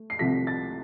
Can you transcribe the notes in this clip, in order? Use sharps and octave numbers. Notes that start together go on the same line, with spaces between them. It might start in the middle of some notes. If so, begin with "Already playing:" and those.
Already playing: A3
C7
C2 C3 F3 A3 B6
A6